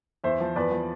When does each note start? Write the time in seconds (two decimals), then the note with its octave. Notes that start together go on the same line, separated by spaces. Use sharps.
0.24 E2 C5 E5
0.40 F3
0.56 E2 B4 D5
0.72 F3